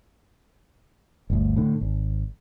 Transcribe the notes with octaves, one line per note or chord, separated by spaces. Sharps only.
G1 D2
A2 D3
G#1